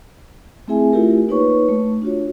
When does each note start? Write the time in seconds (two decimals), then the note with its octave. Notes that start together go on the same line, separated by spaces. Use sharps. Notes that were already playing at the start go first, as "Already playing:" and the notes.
0.68 A3 C4 E4 G#4 E5 G#5
0.92 A3 E4 F4 G4 A#4
1.28 A#3 D#4 B4 C#5 C#6
1.69 A3
2.02 D4 F4 F#4 C#5